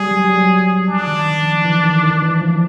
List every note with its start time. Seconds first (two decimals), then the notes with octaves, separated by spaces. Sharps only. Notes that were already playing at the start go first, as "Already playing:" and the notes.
Already playing: G3 G#4
0.11 F#3
0.24 G3
0.37 F#3
0.88 F3 D4
1.07 D#3
1.26 D#3
1.45 F3
1.64 E3
1.84 D#3
2.03 D#3
2.22 E3
2.41 F3